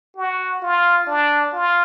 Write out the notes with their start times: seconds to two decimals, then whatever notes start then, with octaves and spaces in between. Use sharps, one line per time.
0.17 F#4
0.62 F4
1.07 D4
1.53 F4